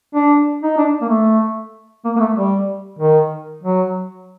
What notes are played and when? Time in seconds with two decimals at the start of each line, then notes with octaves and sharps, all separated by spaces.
0.14 D4
0.63 D#4
0.78 D4
1.02 A#3
1.09 A3
2.04 A#3
2.16 A#3
2.20 A3
2.36 G3
2.99 D#3
3.63 F#3